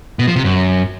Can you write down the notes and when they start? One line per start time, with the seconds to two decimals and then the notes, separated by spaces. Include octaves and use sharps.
0.19 B2
0.28 F3
0.36 C3
0.44 F#2